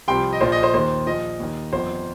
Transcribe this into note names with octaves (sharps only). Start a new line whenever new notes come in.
C2 C3 F3 G5 C6
D#5
A#1 A#2 F3 C5
D#5
C5
D#2 D#3 C5
A#1 A#2 F3 D#5
D#2 D#3
G1 F2 F3 C5